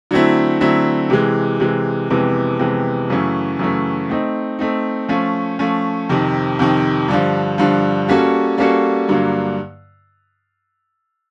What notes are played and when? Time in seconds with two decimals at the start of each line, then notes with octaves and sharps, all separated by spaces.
0.11 D3 F#3 A3 C4 E4
0.60 D3 F#3 A3 C4 E4
1.10 C3 E3 G#3
1.60 C3 E3 G#3
2.10 F2 C3 E3 G#3 B3
2.59 F2 C3 E3 G#3 B3
3.10 F#2 C#3 E3 A3 C#4
3.59 F#2 C#3 E3 A3 C#4
4.09 A3 C4 D#4
4.59 A3 C4 D#4
5.09 F3 A3 C#4
5.59 F3 A3 C#4
6.09 F2 C3 D#3
6.59 F2 C3 D#3
7.08 G2 D3 F3
7.58 G2 D3 F3
8.08 G3 A#3 C#4 F#4 A4
8.58 G3 A#3 C#4 F#4 A4
9.09 G2 D3 F#3 A#3